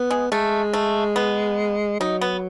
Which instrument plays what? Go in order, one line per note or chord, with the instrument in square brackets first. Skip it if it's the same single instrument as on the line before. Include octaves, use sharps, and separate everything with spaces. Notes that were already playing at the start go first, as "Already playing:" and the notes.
Already playing: [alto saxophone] B3
[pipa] G#3
[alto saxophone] G#3 [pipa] A3
[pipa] A3
B3
[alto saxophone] F#3 [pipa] D#4
[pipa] B3